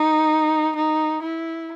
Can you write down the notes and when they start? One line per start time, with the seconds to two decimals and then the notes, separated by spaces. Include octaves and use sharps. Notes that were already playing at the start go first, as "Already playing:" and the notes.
Already playing: D#4
0.76 D#4
1.22 E4